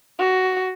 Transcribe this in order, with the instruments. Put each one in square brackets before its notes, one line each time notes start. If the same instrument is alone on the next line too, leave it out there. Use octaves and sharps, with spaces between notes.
[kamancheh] F#4